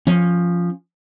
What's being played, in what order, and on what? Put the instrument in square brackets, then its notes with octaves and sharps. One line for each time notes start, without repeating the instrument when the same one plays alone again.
[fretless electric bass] F3 C#4